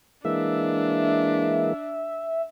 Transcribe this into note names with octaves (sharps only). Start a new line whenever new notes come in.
E3 G#3 A#3 D4 E5